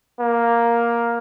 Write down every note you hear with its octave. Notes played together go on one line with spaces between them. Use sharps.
A#3